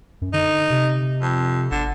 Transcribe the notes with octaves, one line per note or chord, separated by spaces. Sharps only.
F#2
D3 D#4
C3
F2
G1 D3